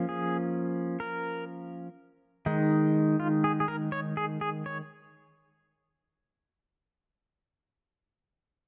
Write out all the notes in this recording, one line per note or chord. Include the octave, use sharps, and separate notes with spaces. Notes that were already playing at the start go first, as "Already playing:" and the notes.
Already playing: F3 A#3 C#4
G#4
A#4
D#3 G#3 D#4
F4
G#4
G#4
A#4
C#5
G#4
G#4
C#5